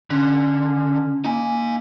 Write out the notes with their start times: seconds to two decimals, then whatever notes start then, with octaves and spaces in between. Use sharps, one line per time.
0.10 D3 C#4
1.24 A#3 D#4 G#5